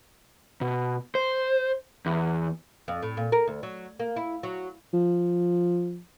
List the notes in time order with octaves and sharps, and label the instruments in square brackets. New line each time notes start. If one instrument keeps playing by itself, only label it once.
[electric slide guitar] B2
C5
E2
[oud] F2
A2
A#2
A#4
D2
F#3
A#3
E4
F#3
[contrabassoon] F3